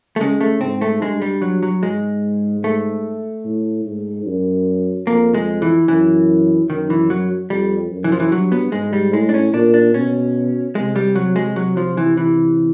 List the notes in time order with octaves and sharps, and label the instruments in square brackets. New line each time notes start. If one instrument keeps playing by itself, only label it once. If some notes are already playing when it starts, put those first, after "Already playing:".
[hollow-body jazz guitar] A3
[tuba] C#3 [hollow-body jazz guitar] G#3
[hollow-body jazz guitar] A3
[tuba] G#2 [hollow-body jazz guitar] C4
[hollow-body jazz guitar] A3
[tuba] G2 [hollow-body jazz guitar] G#3
[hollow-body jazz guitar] G3
F#3
F#3
[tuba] G#2 [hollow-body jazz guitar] G#3
[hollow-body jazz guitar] A3
[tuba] A2
G#2
F#2
[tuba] F2 [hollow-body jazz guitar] A#3
[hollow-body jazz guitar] G#3
E3
[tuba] F#2 [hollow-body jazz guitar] E3
[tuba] F#2 [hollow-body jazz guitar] D#3
[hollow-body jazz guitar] E3
F#3
[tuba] F2 [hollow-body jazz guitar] G3
[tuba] F#2
[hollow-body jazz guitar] E3
F3
E3
[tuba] G2 [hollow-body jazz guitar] F#3
[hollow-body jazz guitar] B3
[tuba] G#2 [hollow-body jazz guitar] G#3
[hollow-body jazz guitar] G3
[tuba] A2 [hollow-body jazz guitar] G#3
[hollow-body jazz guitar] D4
C#4
[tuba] A#2 [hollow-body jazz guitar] D4
[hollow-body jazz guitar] D4
[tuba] B2 [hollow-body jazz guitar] C#4
[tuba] C3 [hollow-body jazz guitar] G#3
[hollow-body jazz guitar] G3
F#3
G#3
F#3
F3
E3
E3